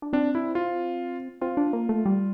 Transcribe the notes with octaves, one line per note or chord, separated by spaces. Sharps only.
D4
C4 D4
E4
F4
C4 F4
D4
A#3
A3
G3